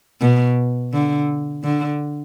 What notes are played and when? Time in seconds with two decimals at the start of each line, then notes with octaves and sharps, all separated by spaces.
0.21 B2
0.93 D3
1.64 D3